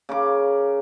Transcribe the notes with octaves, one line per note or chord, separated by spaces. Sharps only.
C#3 A#4 D6